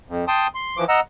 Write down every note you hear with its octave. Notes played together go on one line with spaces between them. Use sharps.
F2
G5 A5 C6 D#6
C6
E3 F3 D6
D#5 F#5 A#5 E6